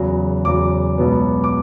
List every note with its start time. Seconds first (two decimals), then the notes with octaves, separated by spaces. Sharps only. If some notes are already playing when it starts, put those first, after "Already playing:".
Already playing: E2 C#3 F#3
0.44 E2 C#3 F#3 D6
0.98 C#2 B2 F#3 B3
1.44 D6